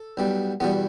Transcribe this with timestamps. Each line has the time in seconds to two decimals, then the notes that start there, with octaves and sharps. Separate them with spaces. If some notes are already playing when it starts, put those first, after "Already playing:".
Already playing: A4
0.17 B1 B2 G3
0.60 E2 B2 G3 B3